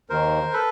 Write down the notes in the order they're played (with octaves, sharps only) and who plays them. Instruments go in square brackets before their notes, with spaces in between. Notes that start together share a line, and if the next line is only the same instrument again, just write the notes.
[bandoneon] D#2 D#3 A#4 C5
A4 B4